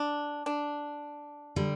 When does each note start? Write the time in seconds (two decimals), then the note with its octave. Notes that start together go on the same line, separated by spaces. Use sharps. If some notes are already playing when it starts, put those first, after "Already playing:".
Already playing: D4
0.46 D4
1.56 D3 G3